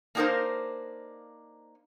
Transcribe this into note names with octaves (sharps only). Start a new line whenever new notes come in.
A#3 D4 D#4 F4 A#4 C5